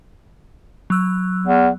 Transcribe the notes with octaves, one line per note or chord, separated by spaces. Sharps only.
F#3 E6 F#6
E2